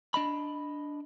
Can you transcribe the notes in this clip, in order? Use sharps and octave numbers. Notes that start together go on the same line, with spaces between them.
D4 D#5 B5